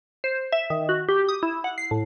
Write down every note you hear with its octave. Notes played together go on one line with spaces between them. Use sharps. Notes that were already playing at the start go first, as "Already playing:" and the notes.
C5
E5
D#3
F#4
G4
D#6
E4
F#5
C7
A2